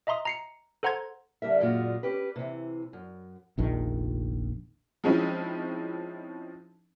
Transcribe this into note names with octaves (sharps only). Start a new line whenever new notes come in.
D#5 E5 A#5 C6 D#6
A#5 C7 C#7
A4 C5 F#5 A#5 C6 G#6
D3 G3 A#4 E5
F#2 A#2 G#3 F4 F#4
C#4 G4 B4
C3 E3
F#2
F1 A#1 D#3
F3 G#3 C4 C#4 D#4 E4